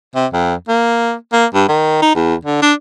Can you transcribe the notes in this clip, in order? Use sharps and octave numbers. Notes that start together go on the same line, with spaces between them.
C3
F2
A#3
A#3
G2
D#3
D#4
E2
D3
D4